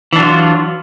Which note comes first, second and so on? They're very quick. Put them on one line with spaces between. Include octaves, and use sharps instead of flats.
E3 D4 F#3 F4